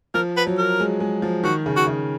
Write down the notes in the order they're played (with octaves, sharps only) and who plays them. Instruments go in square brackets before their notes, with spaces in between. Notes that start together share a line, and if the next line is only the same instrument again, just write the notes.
[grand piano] F3 [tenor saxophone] A#4
[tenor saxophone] B4
[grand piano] F#3
[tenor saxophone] A#4
[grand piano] G#3
G#3
F3
[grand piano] D#3 [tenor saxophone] F#4
[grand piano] C#3
[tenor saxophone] F#4
[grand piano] C#3